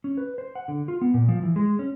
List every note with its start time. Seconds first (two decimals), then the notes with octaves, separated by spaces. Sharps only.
0.04 C#4
0.17 B4
0.38 C5
0.55 F#5
0.68 D3
0.88 F4
1.01 B3
1.14 A#2
1.29 F3
1.43 E3
1.56 G#3
1.79 C#4